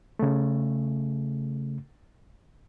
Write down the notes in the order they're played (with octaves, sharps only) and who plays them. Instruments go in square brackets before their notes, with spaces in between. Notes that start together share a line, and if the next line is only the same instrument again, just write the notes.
[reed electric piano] C#3 A3